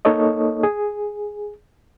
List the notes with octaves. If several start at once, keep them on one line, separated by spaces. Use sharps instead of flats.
A#3 D#4 A4 C#5 D#5
G#4